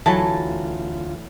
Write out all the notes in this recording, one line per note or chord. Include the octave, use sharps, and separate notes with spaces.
D2 E3 F#3 A3 F4 A5